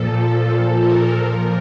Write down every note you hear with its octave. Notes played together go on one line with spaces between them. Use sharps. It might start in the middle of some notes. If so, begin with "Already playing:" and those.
Already playing: A#2 F3 A4
A4
A4
A#4
A#2 F3 A#4